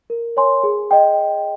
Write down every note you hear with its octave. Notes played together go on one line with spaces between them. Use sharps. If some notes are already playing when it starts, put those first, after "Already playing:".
A#4
C#5 G#5 C6
G#4
D#5 G5